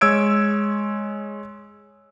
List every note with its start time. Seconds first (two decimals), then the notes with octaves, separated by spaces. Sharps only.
0.01 G#3 C#5 E6 G#6 D7